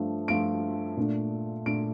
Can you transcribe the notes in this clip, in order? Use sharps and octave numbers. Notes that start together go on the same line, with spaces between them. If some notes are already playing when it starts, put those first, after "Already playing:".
Already playing: G2 F3 A3
G2 F3 A3 D7
A#2 A3 D4
A#2 A3 D4 D7